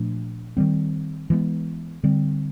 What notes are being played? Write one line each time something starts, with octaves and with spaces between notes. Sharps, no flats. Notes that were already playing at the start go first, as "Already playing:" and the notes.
Already playing: A#2 F3 A3 D4
D#3 G3 C4
E3 G#3 B3
D3 G3 C4